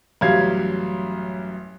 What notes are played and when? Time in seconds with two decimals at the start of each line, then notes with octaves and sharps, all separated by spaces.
0.21 A1 F#2 G3 F5 G#6